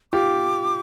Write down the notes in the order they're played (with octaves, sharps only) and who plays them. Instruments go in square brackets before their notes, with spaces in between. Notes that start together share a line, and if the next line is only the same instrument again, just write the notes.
[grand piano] F4 G4 [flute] D6